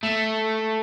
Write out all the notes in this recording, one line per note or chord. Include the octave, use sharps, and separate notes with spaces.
A3